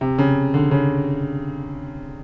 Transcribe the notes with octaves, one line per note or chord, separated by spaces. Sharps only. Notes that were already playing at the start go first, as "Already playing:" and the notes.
C3
C#3
D3
C#3